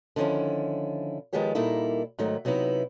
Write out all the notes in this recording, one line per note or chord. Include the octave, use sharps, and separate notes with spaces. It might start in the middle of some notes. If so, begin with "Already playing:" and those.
D3 D#3 F3 C#4 E4
D#3 F3 G#3 B3 G4 C#5
A#2 G3 A#3 D#4 E4 A4
G#2 D#3 F#3 A3
C3 F#3 B3 D#4 E4